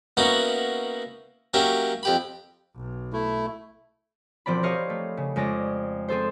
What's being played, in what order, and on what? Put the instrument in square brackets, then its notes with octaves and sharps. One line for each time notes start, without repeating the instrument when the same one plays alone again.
[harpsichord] A#3 B3 C#4 D#4 E4 F#4
F#3 A#3 C#4 G4 E5
F2 G4 B5
[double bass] B1
[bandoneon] A3 E4
[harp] E1 F3 C4 D5 B5
G4 A#4 C#5 D#5 F5
A3
C#3
F2 G#3 C#4 D5 A#6
C4 G#4 A4 C5